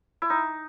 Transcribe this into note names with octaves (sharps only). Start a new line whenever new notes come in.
E4
D#4